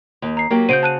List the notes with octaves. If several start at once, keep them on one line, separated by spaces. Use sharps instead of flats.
D#2
A#5 C7
F#3 A#3 G4
C#3 F#4 C5 G6 D7 D#7
A5 F#6 D#7